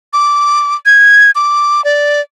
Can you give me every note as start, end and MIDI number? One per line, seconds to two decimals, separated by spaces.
0.13 0.75 86
0.86 1.31 92
1.35 1.84 86
1.85 2.21 74